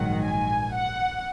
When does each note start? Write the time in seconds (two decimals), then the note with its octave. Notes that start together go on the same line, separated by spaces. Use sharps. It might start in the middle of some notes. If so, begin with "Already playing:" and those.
Already playing: A#1 G#2 D#3 F#3 F#5
0.24 G#5
0.75 F#5